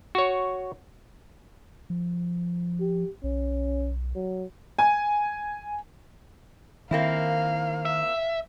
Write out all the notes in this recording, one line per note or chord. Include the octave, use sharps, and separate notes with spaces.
F#4 C#5
F3
G4
B1 C#4
F#3
G#5
D#3 A#3 C4 E4 F5
E5